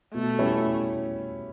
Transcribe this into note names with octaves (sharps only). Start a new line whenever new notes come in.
B2 A3
G3 C#4 E4